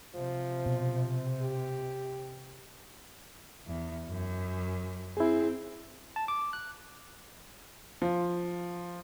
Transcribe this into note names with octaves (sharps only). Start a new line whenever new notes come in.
C3 F3
B2
G4
E2
F#2
C4 E4 G#4
A5
D6
F#6
F3